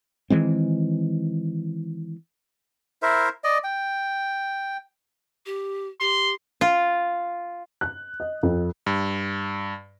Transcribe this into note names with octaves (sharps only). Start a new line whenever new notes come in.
D#3 E3 G#3 C4
E4 A#4 C5 E5
D5 D#5
G5
G4
G4 C6
F4
F#6
D#5
F2
G2